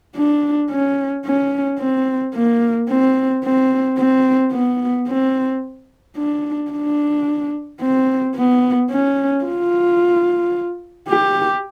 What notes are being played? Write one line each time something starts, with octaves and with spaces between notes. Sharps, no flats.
D4
C#4
C#4
C4
A#3
C4
C4
C4
B3
C4
D4
D4
C4
B3
C#4
F4
G4